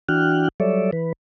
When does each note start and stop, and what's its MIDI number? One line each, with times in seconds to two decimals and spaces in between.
0.09 0.49 52
0.09 0.49 62
0.09 0.49 66
0.09 0.49 79
0.09 0.49 89
0.09 0.49 90
0.60 0.91 54
0.60 0.91 55
0.60 0.91 69
0.60 0.91 73
0.60 0.91 74
0.60 0.91 76
0.93 1.13 52
0.93 1.13 71